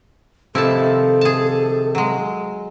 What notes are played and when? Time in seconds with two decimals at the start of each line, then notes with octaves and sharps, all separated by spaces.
0.55 C3 D#3 F3 E4 A4 A5
1.21 G#4 A5
1.95 F#3 G#3